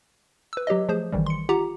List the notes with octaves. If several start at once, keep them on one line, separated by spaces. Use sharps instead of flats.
B4 E6
F#3 G4 C#5 D#5
F3 A3 G#4 C5
A1 D#3 E3 G3
C6 C#7
F4 G4 F#5 A#5